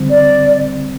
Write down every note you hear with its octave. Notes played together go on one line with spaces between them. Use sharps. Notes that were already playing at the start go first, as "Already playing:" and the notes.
Already playing: D3 G3 C4
D5